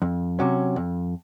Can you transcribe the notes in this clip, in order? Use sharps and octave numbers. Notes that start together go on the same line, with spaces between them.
F2
C3 F#3 C#4
F2